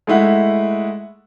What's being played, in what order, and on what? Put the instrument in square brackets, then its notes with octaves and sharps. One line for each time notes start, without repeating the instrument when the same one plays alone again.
[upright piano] G#3 A3 E4 F#5